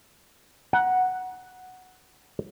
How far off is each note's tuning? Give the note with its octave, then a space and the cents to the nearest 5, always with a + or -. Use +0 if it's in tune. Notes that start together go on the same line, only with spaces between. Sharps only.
F#5 +0 A#5 +40